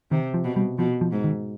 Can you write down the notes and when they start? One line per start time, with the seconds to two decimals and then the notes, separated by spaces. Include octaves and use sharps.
0.11 C3 D#3
0.34 F3
0.45 B2
0.56 G3
0.78 B2 F3
1.01 F3
1.12 G#2
1.24 D#3